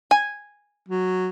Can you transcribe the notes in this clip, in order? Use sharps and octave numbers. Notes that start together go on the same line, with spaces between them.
G#5
F#3